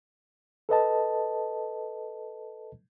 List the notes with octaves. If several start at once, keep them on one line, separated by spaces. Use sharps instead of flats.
A4 B4 D#5 A5